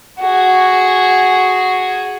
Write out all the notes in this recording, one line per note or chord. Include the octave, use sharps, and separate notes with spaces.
F#4 G#4